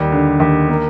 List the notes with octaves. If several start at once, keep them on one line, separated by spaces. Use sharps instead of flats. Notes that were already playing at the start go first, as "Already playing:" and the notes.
Already playing: D#2 G3
D3
D#2
A#3